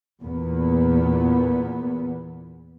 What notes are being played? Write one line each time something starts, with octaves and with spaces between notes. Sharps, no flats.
E2 A#2 B3